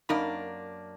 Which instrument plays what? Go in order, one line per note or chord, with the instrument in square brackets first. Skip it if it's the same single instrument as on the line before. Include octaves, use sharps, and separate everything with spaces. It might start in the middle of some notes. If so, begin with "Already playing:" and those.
[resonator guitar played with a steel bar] F#2 A#3 D4 [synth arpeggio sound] D#4 B5